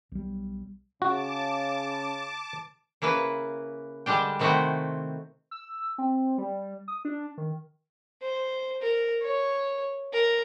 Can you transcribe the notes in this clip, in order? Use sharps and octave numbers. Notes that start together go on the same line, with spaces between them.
B1 G3
C#3 F#4 A5 D6
C#3 A#3 E4 B4
D3 G3 G#3 D4 G5
C3 D#3 A3 C4 E4 F#4
E6
C4
G3
D#6
D4
D#3
C5
A#4
C#5
A#4